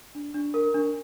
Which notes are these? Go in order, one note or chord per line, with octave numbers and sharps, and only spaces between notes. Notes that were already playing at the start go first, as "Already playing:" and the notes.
D4
D4
A#4
D4